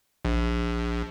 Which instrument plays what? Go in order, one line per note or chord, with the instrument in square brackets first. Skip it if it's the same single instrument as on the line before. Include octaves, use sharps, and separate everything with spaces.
[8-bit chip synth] A#1